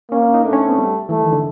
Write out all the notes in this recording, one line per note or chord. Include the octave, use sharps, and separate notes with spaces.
A#3 C#4
C#4
D#4
A3 D4
C#4
C4
B3
G3
E3 A3
D#3
D3